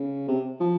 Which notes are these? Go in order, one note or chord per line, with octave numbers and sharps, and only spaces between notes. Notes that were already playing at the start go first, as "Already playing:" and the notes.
Already playing: C#3
C3
F3